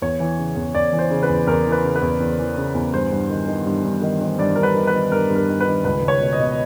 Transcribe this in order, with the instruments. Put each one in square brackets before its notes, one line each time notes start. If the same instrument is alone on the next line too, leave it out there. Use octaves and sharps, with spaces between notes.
[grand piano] E2 C#5
E3
C#3
E2
E2 D5
E3
C5
C#3
B4
E2
E2 A#4
E3
B4
C#3
B4
E2
E2
E3
C#3
E2
G2 C5
G2
D#3
D#3
G2
G2
D#3
D#3
G2 D5
G2 A#4
B4
D#3
B4
D#3
G2 A#4
G2
A#4
D#3
B4
D#3
C#2 B4
C#2
C#5
B2
D#5
B2